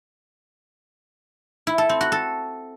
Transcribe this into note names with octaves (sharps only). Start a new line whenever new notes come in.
E4
A4
C4
F#4
A4